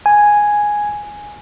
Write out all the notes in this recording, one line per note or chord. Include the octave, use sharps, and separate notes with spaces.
G#5